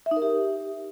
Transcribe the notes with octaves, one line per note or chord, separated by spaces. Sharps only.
E5
D#4
A#4
G4